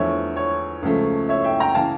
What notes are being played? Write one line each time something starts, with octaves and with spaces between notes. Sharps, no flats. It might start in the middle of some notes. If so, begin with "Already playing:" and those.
Already playing: E2 D3 F3 A3 C#5 E5
C#5
C#2 C#3 F3 A3
C#5 E5
E5 G5
G5 A#5
C#3 E3 F5 A5